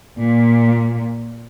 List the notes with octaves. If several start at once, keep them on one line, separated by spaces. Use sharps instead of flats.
A#2